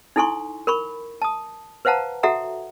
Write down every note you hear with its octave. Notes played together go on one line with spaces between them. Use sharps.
D#4 E4 A4 G#5 C6 C#6
A#4 B5 C#6
A5 D#6
B4 C5 F5 F#5 A5 A#5
F#4 A4 E5 F#5 A#5